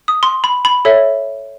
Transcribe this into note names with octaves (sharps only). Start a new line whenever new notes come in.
D#6
C6
B5
B5
A4 C#5 E5